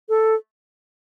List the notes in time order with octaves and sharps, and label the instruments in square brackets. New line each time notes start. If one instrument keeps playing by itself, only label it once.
[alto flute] A4